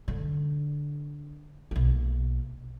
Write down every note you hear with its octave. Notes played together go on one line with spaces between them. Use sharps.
D3
B1 A#3